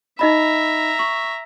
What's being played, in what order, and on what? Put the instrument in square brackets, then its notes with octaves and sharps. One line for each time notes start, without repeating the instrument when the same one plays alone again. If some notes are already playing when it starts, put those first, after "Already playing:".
[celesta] D#4 D#5 B5 [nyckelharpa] E5 A#5
[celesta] C#6